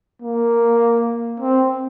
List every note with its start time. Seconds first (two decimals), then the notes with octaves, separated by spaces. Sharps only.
0.22 A#3
1.40 C4